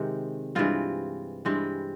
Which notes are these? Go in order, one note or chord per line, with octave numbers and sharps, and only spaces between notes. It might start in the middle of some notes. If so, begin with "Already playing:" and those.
Already playing: C3 D#3 G#3 C4
G2 E3 G#3 C4 F4
G2 E3 G#3 C4